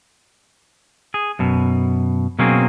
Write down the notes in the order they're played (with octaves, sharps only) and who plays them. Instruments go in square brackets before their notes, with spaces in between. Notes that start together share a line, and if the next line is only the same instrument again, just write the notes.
[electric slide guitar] G#4
F#2 B2
B2 F#3 A#3 C4 C#4 G#4